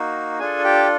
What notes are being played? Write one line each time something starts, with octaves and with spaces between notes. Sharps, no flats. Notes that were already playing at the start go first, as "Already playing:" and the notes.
Already playing: A#3 D#4 F#4
D4 F4 G#4 A4 G#5
G4 G5